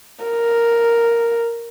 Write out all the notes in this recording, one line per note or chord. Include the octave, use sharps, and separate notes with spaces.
A#4